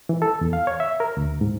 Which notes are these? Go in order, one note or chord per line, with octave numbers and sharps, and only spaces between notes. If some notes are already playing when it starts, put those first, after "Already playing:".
E3
A4
E2
F5
C#5
E5
A#4
D2
G#2